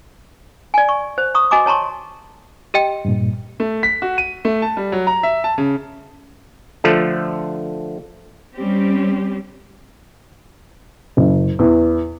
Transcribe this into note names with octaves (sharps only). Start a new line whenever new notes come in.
D5 G#5
C#6
C5
A#5 C#6 D#6
F#4 D#5 G#5 A#5 D6
C#5 A5 A#5 C6 C#6
G4 D#5 G5
G2 A#2
A3
B6
F#4
D#7
A3
A5
G3
F#3
A#5
E5
A5
C#3
D3 F3 A3
G3 C4 C#4 G4
F#1
E2